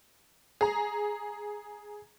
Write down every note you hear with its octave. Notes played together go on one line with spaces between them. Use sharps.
G#4 A#5